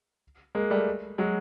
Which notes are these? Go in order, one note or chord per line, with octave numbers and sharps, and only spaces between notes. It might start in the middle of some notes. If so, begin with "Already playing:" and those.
G#3 A#3
G3 A3
F#3 G#3